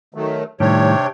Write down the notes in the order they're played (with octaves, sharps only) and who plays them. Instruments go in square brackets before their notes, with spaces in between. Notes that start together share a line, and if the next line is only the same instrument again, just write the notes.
[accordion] D#3 F#3 A3
[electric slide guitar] A2 D#3 G3 [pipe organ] C3 D4 G5 [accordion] C#5